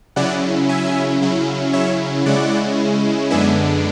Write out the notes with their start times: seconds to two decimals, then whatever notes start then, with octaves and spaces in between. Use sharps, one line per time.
0.16 C#3 F#3 C#4 E4 D5 F#5
0.69 E5 G#5
1.21 C#3 F#3 C#4 E4
1.73 C#5 E5
2.26 C#3 G#3 C#4 E4 D5 F#5
3.30 F#2 D3 G#3 B3 D4 E5 G#5